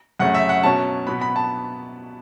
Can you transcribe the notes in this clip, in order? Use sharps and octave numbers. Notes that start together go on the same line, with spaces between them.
F#2 C#3 A3 C#4 F#5
E5
F#5
B2 F#3 C#4 A5
B2 F#3 B3 B5
B5
A5